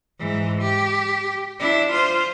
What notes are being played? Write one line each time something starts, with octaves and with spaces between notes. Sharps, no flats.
G#2 E3
G4
D4 E4
F4 C5